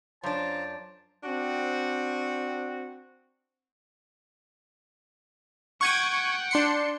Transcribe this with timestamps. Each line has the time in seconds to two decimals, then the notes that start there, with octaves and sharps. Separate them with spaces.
0.23 F#2 D4 F4 C5 C#5 A5 A#5
1.24 C4 D4 F#4
5.81 F#5 G5 C#6 G#6 D#7
6.51 D4 C6 C#7